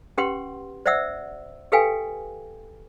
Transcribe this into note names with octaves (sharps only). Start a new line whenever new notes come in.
C#4 G4 B4 F#5 C6
C5 D5 E5 F#5 E6
G4 A4 B4 F5 G5 G#5